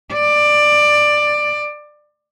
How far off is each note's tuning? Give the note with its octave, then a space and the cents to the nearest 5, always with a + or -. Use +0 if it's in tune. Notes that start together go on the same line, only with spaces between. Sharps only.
D5 +15